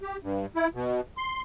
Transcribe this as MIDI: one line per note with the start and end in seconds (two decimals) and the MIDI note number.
0.01 0.17 67
0.23 0.46 43
0.56 0.68 64
0.75 1.01 47
1.17 1.42 84